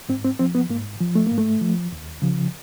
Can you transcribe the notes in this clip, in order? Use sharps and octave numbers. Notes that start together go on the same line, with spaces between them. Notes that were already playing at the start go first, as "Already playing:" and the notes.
G#2 C4
C4
F3 C4
B3
G#2 A#3
F3
A3
G#2 A#3
A3
F3
D#2
C#3 F3